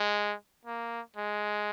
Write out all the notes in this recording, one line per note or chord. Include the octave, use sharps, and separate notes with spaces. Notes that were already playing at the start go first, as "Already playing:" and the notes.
Already playing: G#3
A#3
G#3